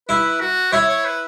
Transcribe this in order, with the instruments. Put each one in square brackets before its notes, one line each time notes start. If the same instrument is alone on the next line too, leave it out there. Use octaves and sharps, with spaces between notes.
[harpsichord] E4 [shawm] B4
[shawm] F#4
[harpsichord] E4 [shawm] C#5
[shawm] C#5
B4